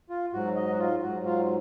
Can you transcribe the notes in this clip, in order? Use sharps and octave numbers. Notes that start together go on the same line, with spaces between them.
F4
G#2 F#3 F#4
D#5
F#4
F4
G#2 F#3 F#4
F4